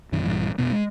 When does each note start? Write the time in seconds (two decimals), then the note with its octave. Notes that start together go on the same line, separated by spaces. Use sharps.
0.12 A#1 F#2 D#3
0.24 A#1 G2 E3
0.58 F1 B2 B3
0.72 G#3